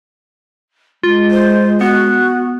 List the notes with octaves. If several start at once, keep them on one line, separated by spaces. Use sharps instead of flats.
G#3 F4
C5
B3 F#4